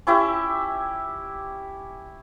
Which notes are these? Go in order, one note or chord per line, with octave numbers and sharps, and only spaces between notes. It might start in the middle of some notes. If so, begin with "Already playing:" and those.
C#4 E4 G4 E5